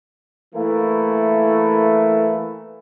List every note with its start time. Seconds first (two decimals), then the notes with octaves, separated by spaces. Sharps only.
0.55 E3 A3 A#3 E4